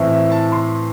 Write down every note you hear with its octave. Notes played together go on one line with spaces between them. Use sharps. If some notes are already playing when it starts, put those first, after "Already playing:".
Already playing: A2 E3 C4 E4
E5
A5
C6